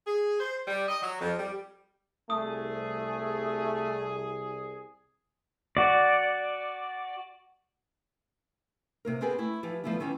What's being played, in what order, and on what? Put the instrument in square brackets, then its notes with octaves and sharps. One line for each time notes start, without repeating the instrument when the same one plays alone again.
[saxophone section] G#4
C5
G3
D#5
F#3
F2
G3
[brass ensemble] C2 G#4 [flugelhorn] A3 [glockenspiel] D#6
[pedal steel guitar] F#4 D5
[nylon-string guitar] C3 A#3 A#4
B3 C4 G4 G#4 A#4 B4
A3 E4
E3 F3 G4
F3 G3 A3 B3 E4
D#3 E3 C4 C#4